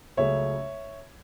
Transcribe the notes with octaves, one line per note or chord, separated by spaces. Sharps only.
C#2 C#3 F#3 A3 C#5 E5